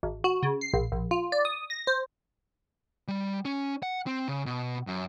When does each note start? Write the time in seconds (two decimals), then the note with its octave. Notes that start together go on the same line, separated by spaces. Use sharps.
0.03 G#1
0.24 F#4
0.43 C#3
0.61 C7
0.74 A#1
0.92 A#1
1.11 F4
1.32 D5
1.45 D#6
1.70 A#6
1.87 C5
3.08 G3
3.45 C#4
3.83 F#5
4.07 C4
4.28 C#3
4.46 B2
4.87 F#2